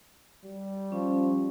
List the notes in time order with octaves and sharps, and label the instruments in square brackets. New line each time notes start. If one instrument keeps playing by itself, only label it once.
[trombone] G3
[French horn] F3 [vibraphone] C#4